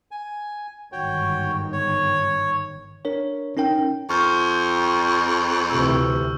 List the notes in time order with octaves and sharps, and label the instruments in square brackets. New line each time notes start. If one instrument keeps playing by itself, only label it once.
[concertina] G#5
[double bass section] G1 G#2 D#3 [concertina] F#4 C#5 G5
[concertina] C#5
[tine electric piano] D4 A#4 C#5
C#4 D#4 A#4 G5
[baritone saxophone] F2 [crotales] C#6 F6 G6
[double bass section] D2 C3 E3 [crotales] E6